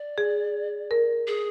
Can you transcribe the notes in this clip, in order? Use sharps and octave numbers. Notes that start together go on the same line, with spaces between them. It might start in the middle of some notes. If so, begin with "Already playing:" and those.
Already playing: D5
G#4
A#4
G#4